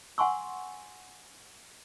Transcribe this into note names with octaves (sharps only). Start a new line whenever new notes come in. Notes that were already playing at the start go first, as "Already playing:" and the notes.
F#5 G#5 C6 C#6 E6